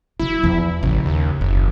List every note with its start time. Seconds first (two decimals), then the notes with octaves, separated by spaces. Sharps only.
0.20 D3 F#3 E4
0.43 E2 F3
0.83 A1 C#3
1.05 D#2
1.41 F#1 D#3